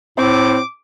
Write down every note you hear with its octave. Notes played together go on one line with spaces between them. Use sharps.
A2 C4 D6